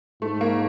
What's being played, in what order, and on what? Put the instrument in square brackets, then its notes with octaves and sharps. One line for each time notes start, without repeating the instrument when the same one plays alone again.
[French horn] G#2 [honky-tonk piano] A3
[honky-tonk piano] A#3